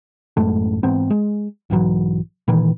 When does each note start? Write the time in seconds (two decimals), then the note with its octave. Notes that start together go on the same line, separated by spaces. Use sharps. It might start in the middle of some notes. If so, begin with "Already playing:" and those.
0.37 A1 F#2 G#3 A3
0.83 G#2 E3 B3 C4
1.10 G#3
1.70 B1 G#2 E3 F#3
2.48 A#2 D#3 E3